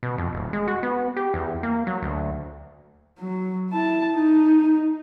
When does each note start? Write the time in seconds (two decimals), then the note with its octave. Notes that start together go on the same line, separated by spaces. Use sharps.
0.03 B2
0.18 F2
0.33 D#1
0.53 G#3
0.68 F#4
0.83 B3
1.16 G4
1.34 E2
1.63 A#3
1.87 F#3
2.02 D2
3.19 F#3
3.71 E4 A5
4.12 D#4